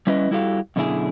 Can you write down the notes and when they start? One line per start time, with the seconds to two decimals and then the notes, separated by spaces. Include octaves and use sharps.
0.07 G3 C#4 E4 B4 D#5
0.31 G3 E4 F#4 G4 A4 F5
0.76 F#2 B2 D3 C4 E4 G#4